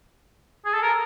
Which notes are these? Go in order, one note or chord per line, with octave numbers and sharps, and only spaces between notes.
G#4
A4
A#4